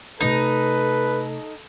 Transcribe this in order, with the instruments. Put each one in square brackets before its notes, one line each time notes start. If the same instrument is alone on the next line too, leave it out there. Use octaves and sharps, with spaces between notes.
[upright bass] C3 A3 [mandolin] D#4 [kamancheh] A4 [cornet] B4